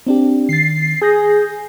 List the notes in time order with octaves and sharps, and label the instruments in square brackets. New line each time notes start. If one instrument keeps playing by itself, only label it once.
[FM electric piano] C4 D4 G4
[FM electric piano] D#3 A6 [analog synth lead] C7
[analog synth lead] G#4 [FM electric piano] G#5 G6 A#6